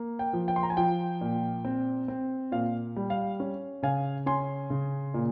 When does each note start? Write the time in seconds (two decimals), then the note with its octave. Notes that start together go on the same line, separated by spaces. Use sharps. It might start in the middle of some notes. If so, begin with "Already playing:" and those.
Already playing: A#3
0.19 G5
0.33 F3
0.48 G5
0.56 C6
0.63 A#5
0.70 G#5
0.77 F3 G5
1.21 A#2
1.65 C4
2.08 C4
2.52 A#2 F5
2.96 G3
3.10 F5
3.40 C#4
3.83 C#3 F5 G#5
4.26 C#4 G#5 C6
4.70 C#3
5.14 A#2